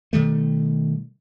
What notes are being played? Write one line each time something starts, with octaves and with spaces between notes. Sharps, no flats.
B2 D#3 G3 A3